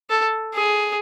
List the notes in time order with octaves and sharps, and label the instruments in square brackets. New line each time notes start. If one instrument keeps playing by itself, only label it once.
[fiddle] A4
G#4